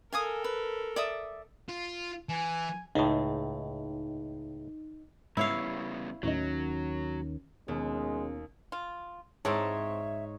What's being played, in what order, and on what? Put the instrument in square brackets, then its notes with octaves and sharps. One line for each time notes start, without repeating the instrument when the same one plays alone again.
[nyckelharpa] A4 A#4 [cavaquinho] F5 G#5 D#6
[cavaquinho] B4
D5 E5 D#6
[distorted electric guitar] F4
[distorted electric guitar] E3 [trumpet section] G#5
[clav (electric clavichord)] C#2 A2 [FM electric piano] D#4
[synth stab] G#2 E5 [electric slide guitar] C#3 G3 B3 [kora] E4 C#5 F5
[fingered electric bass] D#2 D#3 C#4 [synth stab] A2 D#4 [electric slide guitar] F#3
[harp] D#2 [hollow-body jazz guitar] B2 [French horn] G#3 [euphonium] C#4
[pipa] F4
[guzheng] G#2 [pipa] C4 E4 A5 [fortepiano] C#5 [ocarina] E5